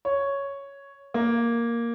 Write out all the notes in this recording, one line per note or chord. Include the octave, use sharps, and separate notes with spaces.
C#5
A#3